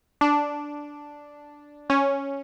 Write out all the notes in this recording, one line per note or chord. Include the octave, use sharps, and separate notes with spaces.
D4
C#4